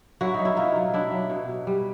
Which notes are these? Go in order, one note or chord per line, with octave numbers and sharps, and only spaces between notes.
F#3 E4 F#4
F#3 D#4
E4
B2 D#4 F4
F#3
F#3 D4 E4
F#3
B2
B2
G3